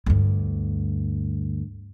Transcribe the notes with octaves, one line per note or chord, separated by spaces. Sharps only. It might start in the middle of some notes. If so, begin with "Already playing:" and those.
D2 G2